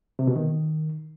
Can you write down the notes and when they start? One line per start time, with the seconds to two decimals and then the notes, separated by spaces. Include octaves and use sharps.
0.19 C3
0.27 B2
0.36 D#3